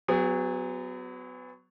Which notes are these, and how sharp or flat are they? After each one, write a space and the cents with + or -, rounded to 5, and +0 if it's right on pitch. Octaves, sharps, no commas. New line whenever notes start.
F#3 +0 B3 +30 G#4 -35